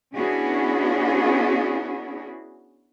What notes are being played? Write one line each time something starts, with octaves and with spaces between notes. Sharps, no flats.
B3 C#4 D4 E4 F#4 G#4